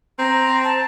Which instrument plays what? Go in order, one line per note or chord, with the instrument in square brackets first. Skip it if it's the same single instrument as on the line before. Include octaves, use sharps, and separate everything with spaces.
[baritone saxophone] C4 [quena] A#5
[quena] A5